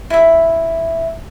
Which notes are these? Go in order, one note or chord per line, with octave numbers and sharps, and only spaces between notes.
E4 E5